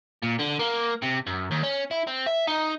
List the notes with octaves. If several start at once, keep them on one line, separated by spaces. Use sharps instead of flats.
A#2
D3
A#3
C3
F#2
D#2
C#4
E4
C4
E5
D#4